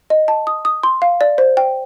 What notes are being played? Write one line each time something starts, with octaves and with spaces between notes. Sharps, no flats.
D#5
A5
D#6
D#6
C6
F5
D5
C5
G5